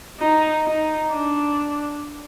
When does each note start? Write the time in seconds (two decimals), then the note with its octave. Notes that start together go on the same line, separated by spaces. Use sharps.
0.20 D#4
0.65 D#4
1.10 D4